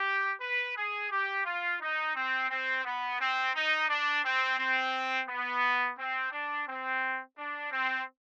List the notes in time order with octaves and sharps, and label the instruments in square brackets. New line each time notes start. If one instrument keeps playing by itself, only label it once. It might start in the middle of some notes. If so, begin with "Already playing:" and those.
Already playing: [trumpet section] G4
B4
G#4
G4
F4
D#4
C4
C4
B3
C4
D#4
D4
C4
C4
B3
C4
D4
C4
D4
C4